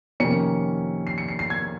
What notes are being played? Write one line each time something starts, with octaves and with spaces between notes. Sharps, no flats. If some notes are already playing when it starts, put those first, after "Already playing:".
F2 C3 D#3 A#3 C#4 C#7
C7
C#7
C7
C7
G#6